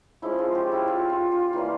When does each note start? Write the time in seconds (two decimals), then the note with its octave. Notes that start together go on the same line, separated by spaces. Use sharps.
0.22 F3 G#3 C#4 E4
0.39 F4
0.55 G4
0.72 E4
0.88 F4
1.10 F4
1.32 F4
1.53 E3 G3 A#3 C#4 F4